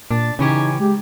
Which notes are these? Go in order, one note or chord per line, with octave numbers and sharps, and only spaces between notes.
A#2 D4 A6
C#3 E3 C#4 D#4 G4 G#6
G#3 G4